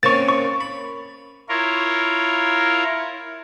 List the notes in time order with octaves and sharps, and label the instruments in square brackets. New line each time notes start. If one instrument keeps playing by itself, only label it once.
[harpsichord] A#3 C4 C#4 [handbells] C#6 A6
[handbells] C#6
[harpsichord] B5
[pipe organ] E4 F4 A#4 C#5